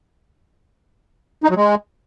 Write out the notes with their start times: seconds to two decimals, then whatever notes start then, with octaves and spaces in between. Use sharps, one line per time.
1.44 D#4
1.50 F#3
1.56 G#3